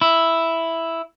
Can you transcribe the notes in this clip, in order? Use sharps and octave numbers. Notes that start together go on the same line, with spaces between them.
E4